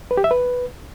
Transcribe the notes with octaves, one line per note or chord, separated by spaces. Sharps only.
B4
G4
E5
B4